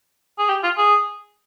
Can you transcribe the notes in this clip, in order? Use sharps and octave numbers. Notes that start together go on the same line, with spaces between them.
G#4
G4
F4
G#4